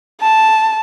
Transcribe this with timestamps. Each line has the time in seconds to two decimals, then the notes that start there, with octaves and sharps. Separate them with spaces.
0.21 A5